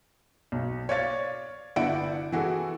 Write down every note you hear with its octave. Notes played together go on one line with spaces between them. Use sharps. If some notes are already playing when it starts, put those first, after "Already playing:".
B1
C#5 D5 F5 A6
G1 E4 D5 F#5 D7
E3 F#4 G#4 A4